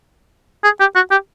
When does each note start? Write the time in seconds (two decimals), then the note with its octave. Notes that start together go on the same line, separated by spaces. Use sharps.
0.64 G#4
0.80 G4
0.95 F#4
1.11 G4